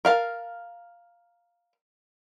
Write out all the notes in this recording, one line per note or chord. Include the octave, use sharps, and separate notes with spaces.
A#4 F5 A5